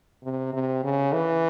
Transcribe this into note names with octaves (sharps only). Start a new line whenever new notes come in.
C3
C3
C#3
E3